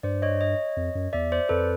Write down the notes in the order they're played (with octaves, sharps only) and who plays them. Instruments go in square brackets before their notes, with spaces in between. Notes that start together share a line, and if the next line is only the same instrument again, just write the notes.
[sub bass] G2 [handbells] C5 D5
[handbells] C#5 D#5
C#5 D#5
[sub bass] F2
F#2
[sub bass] E2 [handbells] D5 E5
[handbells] C5 D5
[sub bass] F2 [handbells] A4 B4